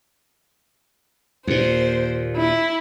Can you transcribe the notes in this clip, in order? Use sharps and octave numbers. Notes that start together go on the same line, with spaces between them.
D#2 A#2 C5
E4